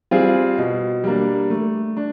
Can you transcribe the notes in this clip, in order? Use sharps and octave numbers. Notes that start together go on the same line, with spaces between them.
G3 C4 F4 G#4
B2
G3 A#3 D4
A3
D4